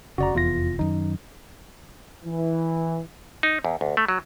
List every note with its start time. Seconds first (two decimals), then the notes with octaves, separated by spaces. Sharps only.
0.18 F1 C#3 F#4 D5 A#5
0.35 F1 E2 F4 A#6
0.79 F#2 D#3 D#4
2.26 E3
3.43 D#4
3.65 E2
3.81 D2
3.97 A3
4.08 F#3